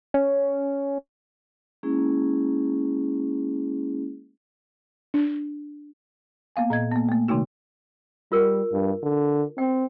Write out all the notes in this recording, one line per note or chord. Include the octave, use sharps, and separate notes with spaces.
C#4
G#3 A#3 C#4 E4 G#4
D4
A#3 B3 F5 G#5
A#2 D#5 G#6
A#3 B3
A3 A#3
C3 D#3 A3 D#4 F#4
G3 F4 A#4
G2
D3
C4 G5